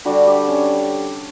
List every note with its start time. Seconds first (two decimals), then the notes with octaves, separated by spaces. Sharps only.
0.05 D3 G3 F#4
0.27 G4
0.48 C#4